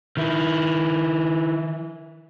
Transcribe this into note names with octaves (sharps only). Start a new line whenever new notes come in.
D#3 E4